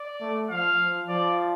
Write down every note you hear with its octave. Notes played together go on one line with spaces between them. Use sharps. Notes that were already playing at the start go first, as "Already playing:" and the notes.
Already playing: D5
A3
F3 F5
F3
F3 D5